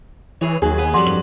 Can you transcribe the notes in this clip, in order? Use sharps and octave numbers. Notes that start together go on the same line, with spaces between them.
E3 G#4 C#5
D#2 F#3 G#4
B3
F2 F#3 G3 F#5 C6 D6
G2 F#7